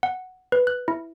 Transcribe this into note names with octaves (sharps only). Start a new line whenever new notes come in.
F#5
B4
F#6
E4